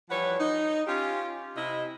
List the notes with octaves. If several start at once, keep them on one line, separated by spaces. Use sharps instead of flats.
E3 F3 G3 B4 C#5 F#5
D#4
C#4 F4 G4
C3 E4 D#5